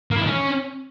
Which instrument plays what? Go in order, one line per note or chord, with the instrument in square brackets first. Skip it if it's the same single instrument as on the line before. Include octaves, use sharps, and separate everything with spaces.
[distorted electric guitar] A#3
E4
D#3
C#4